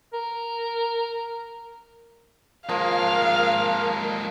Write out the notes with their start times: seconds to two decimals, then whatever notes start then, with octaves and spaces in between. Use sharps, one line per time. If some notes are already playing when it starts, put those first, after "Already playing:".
0.14 A#4
2.69 F3 G#3 A#3 A#4 F5